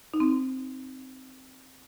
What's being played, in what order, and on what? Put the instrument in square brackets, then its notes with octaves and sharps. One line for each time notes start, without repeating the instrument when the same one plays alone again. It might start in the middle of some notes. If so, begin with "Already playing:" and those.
[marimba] D#4
C4